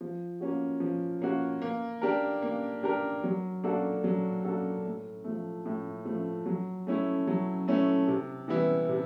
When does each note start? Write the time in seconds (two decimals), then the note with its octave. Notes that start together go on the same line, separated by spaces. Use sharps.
0.01 F3
0.40 A#3 C#4 F#4
0.80 F3
1.22 A#3 C#4 F#4
1.62 A#3
2.01 D4 G4 A#4
2.42 A#3
2.83 D4 G4 A#4
3.24 F#3
3.64 A#3 D4 F#4 A4
4.04 F#3
4.44 A#3 D4 F#4 A4
4.84 A2
5.24 F3 A3
5.65 A2
6.05 F3 A3
6.46 F#3
6.87 A3 C#4 E4
7.27 F#3
7.68 A3 C#4 E4
8.08 C3
8.48 E3 G3 B3 E4
8.88 C3